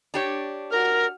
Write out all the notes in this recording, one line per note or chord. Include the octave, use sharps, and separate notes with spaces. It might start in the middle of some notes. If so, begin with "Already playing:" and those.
D4 G4 C#5
F#4 A#4 F6